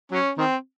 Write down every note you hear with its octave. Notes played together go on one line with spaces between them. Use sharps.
F#3 C#4
D#3 C4